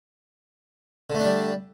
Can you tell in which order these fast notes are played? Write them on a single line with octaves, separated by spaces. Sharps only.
D3 A3 D4 G3